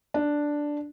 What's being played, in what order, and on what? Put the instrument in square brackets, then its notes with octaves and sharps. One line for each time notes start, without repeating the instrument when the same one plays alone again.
[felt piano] D4